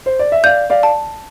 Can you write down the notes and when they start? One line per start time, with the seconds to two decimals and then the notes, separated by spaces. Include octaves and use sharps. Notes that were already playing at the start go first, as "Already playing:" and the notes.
0.06 C5
0.19 D5
0.32 E5
0.44 D5 F5 G6
0.70 D5 F5
0.83 A5